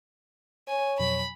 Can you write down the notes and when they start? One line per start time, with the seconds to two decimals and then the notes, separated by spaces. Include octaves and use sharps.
0.68 C#5 G#5
1.00 F2 B2 F#3 B5